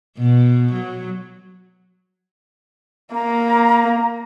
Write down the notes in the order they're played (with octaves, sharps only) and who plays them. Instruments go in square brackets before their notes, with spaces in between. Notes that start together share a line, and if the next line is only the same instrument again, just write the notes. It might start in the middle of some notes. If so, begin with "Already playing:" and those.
[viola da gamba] B2
F#3
[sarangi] A#3 [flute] A#5